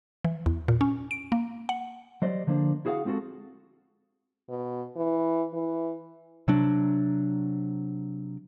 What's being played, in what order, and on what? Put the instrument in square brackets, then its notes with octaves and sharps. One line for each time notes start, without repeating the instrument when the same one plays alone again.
[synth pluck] E3
E2
A#2
C#4
D7
A#3
F#5
[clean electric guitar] F#3 G3 C5 D5 D#5
D3 F3 A#3 D4 C5
E4 F#4 G#4 C#5 F5 F#5
G#3 C4 F4 F#4 A4
[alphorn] B2
E3
E3
[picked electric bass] C3 F#3 D4